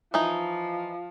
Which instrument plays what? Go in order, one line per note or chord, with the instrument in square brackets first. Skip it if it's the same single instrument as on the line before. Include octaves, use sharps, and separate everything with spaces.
[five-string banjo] E3 D#4 [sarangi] F3